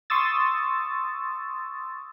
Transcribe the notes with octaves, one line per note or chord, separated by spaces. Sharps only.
C6 C#6 D#6 E6 A6